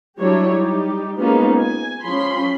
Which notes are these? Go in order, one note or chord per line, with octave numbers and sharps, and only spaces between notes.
F#3 G3 D4 E4 G4 C#5
G3 D#4 G4
G#3 A#3 B3 C#4 D#4 F4
G#5
F3 C#4 B5 C6